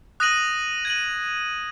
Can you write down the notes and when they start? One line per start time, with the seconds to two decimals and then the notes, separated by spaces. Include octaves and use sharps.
0.20 D#6 F#6 A#6 D#7 F#7
0.85 G#6 D#7 F#7